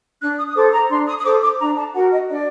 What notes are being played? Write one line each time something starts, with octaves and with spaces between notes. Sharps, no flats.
D4 F#6
D#6
D#6
A4 C5 D6
A#5
D4 C6
D#6
D#6
A4 C5 D6
D6
D4 A#5
A5
F#4 A#4 F#5
D#5
D4 D5